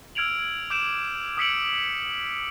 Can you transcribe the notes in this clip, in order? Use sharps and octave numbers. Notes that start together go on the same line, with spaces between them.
E6 F6 G#6 D7 F7 F#7
D6 G6 D7 E7
D#6 E6 B6 C#7 D7 F#7